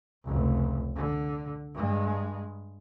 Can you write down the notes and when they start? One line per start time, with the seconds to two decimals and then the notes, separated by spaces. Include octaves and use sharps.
0.24 F1 C#2
0.96 D3
1.74 G2 G#3